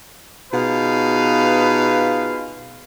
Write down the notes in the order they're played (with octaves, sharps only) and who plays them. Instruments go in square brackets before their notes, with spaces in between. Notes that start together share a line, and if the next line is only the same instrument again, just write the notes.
[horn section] B2 D#4 F4 G#4 B4 F5